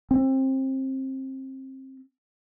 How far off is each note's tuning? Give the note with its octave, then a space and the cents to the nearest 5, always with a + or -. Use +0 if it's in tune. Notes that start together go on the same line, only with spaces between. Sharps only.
C4 +25